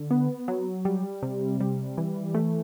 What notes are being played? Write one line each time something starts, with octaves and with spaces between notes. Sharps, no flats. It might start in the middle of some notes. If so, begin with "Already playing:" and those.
Already playing: D3
B3
F#3
G3
C3
G3
E3
A3